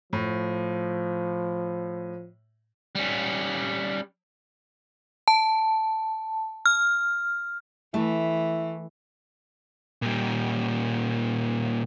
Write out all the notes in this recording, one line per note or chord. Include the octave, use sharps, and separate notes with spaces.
A2 F3
G3 C#4
A5
F6
E3 A3 E4
A#2 G3